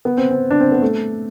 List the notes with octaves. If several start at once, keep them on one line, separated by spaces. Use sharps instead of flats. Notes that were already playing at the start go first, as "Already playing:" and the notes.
B3
C4
C4
D4
C4
B3
A3